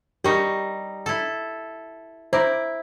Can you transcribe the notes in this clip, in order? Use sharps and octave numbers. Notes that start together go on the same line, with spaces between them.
G3 D#4 G4 A#4 C#6
E4 A4
E4 C5 A#5 D6